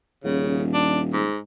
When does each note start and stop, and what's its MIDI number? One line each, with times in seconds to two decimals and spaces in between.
0.24 1.27 27
0.24 0.64 49
0.73 1.01 62
1.13 1.38 44